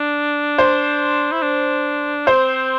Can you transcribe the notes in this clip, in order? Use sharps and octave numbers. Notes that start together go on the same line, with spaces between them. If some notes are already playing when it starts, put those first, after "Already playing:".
Already playing: D4
C5
E4
D4
C4 C5